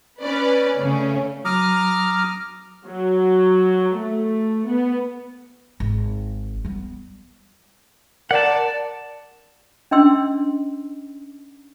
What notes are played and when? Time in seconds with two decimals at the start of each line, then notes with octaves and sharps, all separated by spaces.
0.23 C#4 B4 D5
0.79 C#3 A3 C#4
1.45 F#3 A#5 D6 D#6 F6
2.86 F#3
3.97 A3
4.67 B3
5.80 G#1
6.65 G3 B3
8.31 A#4 D5 F#5 A5
9.91 C#4 D4 D#5 G5 C6 E6